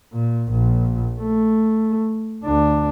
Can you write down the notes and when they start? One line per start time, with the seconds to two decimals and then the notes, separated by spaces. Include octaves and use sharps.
0.13 A#2
0.50 A#1 A#2
1.20 A3
2.44 D2 D4